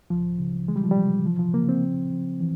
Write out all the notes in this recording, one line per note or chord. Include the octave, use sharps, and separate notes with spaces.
C#2 F3
C#3
E3 G#3
G3
F3
G3
C3
E3 F3
F3
C#3 A#3
C4
F3
F3
E3